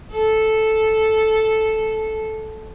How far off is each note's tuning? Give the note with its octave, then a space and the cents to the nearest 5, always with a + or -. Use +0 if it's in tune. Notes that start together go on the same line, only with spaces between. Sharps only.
A4 -5